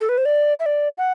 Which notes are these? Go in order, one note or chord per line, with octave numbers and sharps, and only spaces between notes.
A4
B4
C5
D5
E5
D5
F#5